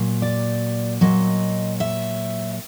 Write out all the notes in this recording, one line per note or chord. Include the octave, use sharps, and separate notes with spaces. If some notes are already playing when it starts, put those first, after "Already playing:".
Already playing: A#2 F#3
D5
A#2 F#3 D#5
E5